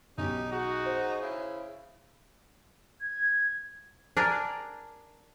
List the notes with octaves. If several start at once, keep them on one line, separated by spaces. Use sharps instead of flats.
B1 C#4 D#4 G4
D#4 F#4 G#4
C5
C#3 E4
G#6
D4 G#4 A#4 D5